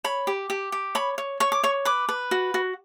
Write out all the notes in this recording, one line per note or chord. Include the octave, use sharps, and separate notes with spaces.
C#5 B5
G4
G4
G4
C#5 B5
C#5
C#5 C#6
D6
C#5 C#6
B4 D6
B4
F#4
F#4